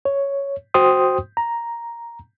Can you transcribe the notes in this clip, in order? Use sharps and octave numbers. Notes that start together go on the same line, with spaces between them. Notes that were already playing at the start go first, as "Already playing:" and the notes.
C#5
F#4 C5 G5 C6 D#6
A#5